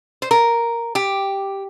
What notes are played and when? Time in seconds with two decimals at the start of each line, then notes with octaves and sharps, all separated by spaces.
0.22 C5
0.31 A#4
0.95 G4